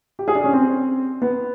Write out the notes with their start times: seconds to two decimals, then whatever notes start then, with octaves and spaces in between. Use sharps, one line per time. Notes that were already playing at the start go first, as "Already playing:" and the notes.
0.19 G4
0.28 G#4
0.35 D4
0.44 C#4
0.53 C4
1.22 B3